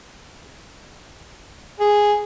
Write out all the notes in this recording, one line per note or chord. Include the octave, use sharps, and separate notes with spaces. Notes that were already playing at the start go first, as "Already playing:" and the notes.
G#4